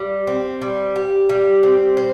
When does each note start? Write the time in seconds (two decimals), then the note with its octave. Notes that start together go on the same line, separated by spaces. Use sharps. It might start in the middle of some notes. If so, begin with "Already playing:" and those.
Already playing: G3
0.27 C4
0.62 G3
0.96 G4
1.29 G3
1.63 C4
1.97 C5